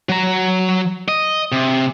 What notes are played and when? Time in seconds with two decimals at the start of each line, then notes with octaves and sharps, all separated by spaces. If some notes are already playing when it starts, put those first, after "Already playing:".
0.09 F#3 A#5
1.08 D#5
1.52 C3